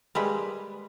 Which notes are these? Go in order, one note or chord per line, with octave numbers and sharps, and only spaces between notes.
G3 G#3 A#3 B4